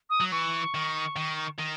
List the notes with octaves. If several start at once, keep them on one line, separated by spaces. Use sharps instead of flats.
D#6
F#3
E3 C#6
D#3
D#3
D#3